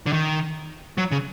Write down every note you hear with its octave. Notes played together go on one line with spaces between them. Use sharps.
D3
D#3
F#3
C#3